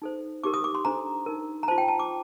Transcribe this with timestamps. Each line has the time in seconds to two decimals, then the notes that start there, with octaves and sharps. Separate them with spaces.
0.02 D#4 A4 C5
0.44 D#4 G4 A#4 D6
0.54 D#6
0.64 D6
0.75 C6
0.85 D4 A4 C5 A#5
1.26 D#4 A#4
1.63 A#5
1.68 F4 C5 A5
1.78 G5
1.88 A5
1.99 D6